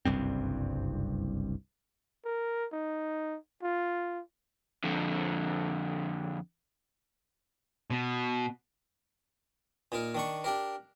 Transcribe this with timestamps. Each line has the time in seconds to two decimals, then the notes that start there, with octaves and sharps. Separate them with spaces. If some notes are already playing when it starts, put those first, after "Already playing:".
0.05 F#1 C2 G2 C4
2.25 A#4
2.73 D#4
3.63 F4
4.84 F2 D3
7.90 B2
9.92 A#2 D#4 A#4
10.15 D#3 D4 C#6
10.44 D4 G4 A#4